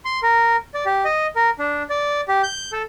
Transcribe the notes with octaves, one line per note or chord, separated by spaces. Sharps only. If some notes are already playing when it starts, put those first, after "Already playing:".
C6
A#4
D5
G4
D#5
A#4
D4
D5
G4
G6
A4